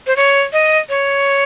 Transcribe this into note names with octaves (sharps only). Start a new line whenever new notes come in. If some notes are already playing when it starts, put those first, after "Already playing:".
C5
C#5
D#5
C#5